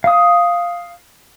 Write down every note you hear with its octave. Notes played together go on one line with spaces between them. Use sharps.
F5 D#6